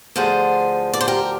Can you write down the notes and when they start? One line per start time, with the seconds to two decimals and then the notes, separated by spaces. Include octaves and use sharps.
0.16 D2 D3 F3 G#4 C5
0.93 D5
1.01 C5
1.08 G4 A#4